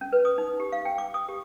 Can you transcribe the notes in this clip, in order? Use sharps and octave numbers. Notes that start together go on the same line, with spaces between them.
C#4
B4
D#6
D#4
G4
F5
G5
D6
D#6
G4